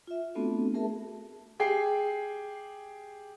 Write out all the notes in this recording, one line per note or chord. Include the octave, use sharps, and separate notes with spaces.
F4 E5
A3 B3 C4 D4 F#4 A4
A3 G#4 A#4 E5 A5
G4 G#4 G5 C7